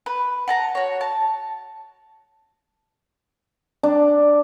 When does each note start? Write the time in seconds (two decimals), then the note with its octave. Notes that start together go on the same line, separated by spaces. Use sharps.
0.06 B4
0.48 F#5 A5 A#5
0.75 F#4 C#5
1.01 A5
3.83 D4